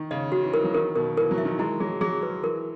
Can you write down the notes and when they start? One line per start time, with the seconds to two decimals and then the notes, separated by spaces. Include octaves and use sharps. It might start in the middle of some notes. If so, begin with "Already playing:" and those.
Already playing: D#3
0.11 C#3 D#5
0.32 D#3 F#4
0.43 E3
0.54 E3 A#4
0.64 F#3
0.74 D#3 A#4
0.95 B2 A#4
1.17 E3 A#4
1.31 F#3
1.38 E5
1.45 D#3
1.59 G#3 E4
1.80 F#3 G#4
2.01 F#3 G#4
2.23 B4
2.43 E3 A#4